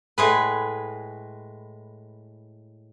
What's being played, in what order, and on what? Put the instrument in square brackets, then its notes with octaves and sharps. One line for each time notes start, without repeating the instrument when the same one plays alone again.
[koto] A2 G#3 B4